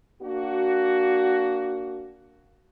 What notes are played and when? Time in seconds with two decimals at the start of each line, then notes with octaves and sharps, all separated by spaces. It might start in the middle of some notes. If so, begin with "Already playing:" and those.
0.23 A#3 D4 F#4